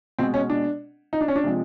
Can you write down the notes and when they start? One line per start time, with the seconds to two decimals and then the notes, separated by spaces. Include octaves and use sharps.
0.18 B2 G#3 C4
0.34 C#4
0.50 D4
1.13 D#4
1.21 D4
1.28 C#4
1.36 D4
1.44 C3 F3 G#3